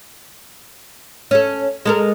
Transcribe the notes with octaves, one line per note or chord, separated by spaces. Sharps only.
C#4 A4
G#3 A4 A#4